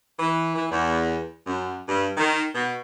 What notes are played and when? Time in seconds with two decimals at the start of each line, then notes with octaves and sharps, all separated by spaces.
0.19 E3
0.55 E3
0.69 E2
1.46 F#2
1.87 G2
2.17 D#3
2.54 B2